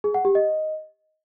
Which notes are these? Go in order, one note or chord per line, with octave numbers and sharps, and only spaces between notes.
G#4
F#5
G4
D#5